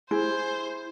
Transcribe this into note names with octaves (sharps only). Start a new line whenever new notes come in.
E4 G#4 C5